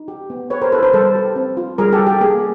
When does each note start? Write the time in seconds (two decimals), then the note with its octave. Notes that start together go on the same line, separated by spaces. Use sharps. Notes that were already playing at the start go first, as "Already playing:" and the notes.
Already playing: D#4
0.08 G4
0.30 B3
0.50 G4 B4 C#5
0.62 A#4 C5
0.72 E4 A4 B4
0.83 A#4 C5
0.93 G3 A4 B4
1.15 G4
1.36 C4
1.57 F4
1.78 G3 G#4 A#4
1.92 G4 A4
1.99 G3
2.07 G4
2.21 A#3 G#4